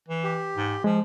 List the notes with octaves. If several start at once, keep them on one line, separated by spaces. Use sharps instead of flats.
E3
G4
G#2
F3 G#3